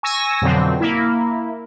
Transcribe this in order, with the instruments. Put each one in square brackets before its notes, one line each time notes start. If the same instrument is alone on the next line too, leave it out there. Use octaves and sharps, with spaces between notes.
[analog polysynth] G#5 C#6 E6 A#6
F2 B2 D3 F#3 C4
A#3 E4